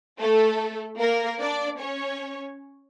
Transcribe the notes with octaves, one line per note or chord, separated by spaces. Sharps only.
A3 A4
A#3 A#4
D4 D5
C#4 C#5